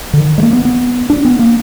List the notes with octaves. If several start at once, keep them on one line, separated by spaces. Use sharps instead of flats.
D3
D#3
G#3
A#3
B3
B3
D4
B3
A#3